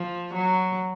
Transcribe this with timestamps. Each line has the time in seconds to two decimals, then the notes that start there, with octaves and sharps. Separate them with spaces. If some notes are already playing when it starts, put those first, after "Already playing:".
Already playing: F3
0.34 F#3